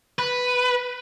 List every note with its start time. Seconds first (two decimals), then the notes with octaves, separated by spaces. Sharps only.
0.19 B4